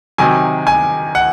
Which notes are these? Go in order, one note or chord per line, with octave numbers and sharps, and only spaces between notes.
C3 D#3 F#3 G#5
G#5
F#5